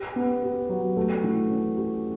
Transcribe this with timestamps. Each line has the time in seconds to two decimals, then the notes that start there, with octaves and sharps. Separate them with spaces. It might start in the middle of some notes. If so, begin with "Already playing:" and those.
Already playing: G4
0.16 B3
0.42 G4
0.69 F#3
0.97 A3
1.24 E3
1.51 C#4
1.77 G4